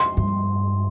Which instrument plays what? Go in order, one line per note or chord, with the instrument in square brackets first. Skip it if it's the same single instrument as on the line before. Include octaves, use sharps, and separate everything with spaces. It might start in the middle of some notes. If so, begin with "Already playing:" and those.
Already playing: [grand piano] C6
[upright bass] G2